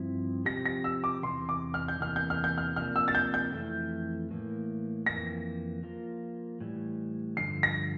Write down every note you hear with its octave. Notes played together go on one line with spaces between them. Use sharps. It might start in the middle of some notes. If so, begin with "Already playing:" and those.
Already playing: G2 F3 C4 E4
C3 F3 C4 G4 A#6
A#6
E6
D6
E2 C3 E3 C6
D6
F6
G6
E2 C3 E3 A#3 F6
G6
F6
G6
F6
C3 F3 A#3 D4 F6
E6
A6
G6
G6
F2 E3 A3 E4
A2 E3 A#3
F2 E3 A#3 A#6
F3 A#3 F4
A2 E3 G3
G2 D3 F3 C7
A#6